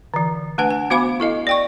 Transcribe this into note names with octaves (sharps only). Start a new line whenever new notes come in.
D3 E3
A3 D4 B4 F#5 G#5
G#5
B3 F#4 C5 F5 B5 D6
E4 A4 D#5 F5
D5 G5 C#6